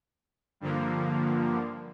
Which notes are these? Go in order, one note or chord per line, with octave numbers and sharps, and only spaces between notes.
G2 D3 F3 A#3